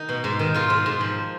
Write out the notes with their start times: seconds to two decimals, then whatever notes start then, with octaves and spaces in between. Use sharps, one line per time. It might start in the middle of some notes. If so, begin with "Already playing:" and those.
Already playing: D#3 D#4
0.09 B2
0.24 G#2
0.39 D#3
0.54 G#2 F4
0.70 G#2
0.86 G#2
1.01 F3